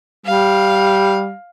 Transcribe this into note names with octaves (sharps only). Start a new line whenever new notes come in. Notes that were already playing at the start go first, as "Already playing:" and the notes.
G3 F5